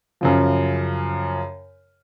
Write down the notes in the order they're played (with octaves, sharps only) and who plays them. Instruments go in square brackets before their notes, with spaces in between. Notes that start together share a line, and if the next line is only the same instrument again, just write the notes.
[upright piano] F#2 C#3 F3